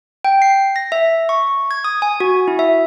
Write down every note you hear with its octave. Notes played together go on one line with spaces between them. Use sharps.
G5
C7
A#6
E5
C#6
G#6
D#6
G#5
F#4
E4
E5